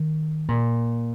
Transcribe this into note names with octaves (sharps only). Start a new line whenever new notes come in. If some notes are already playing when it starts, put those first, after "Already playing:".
Already playing: D#3
A#2